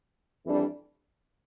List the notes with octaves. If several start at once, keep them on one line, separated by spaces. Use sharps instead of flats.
F2 E3 G3 D4